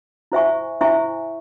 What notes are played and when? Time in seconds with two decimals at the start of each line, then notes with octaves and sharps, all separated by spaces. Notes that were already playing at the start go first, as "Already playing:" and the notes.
0.32 E4 C5 E5 G#5 C#6
0.81 E4 C5 E5 G#5 C#6